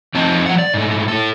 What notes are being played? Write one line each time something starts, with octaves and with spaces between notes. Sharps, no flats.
F2 C4 D#4 A5
F3 F#5
D5
G#2 A3
E4 A4